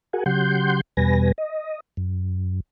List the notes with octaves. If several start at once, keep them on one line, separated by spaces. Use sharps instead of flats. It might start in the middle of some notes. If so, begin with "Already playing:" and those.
F#4 G#4 A#4 F#5 G#5
C#3 F#3 G4 F#5 C6 G6
E2 B2 G3 B4 G#5 A#6
D#5
F#2